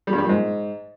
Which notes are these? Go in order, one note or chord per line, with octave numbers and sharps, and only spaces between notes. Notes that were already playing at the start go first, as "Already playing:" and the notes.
G3
G2
G3
A#2
G#2